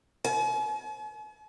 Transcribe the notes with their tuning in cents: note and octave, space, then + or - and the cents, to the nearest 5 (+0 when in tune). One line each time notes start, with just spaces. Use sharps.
G#5 +45